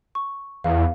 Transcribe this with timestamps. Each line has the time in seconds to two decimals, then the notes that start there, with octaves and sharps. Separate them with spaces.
0.15 C#6
0.64 E2 F5